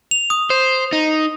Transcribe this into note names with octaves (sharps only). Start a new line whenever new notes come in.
F7
D#6
C5
D#4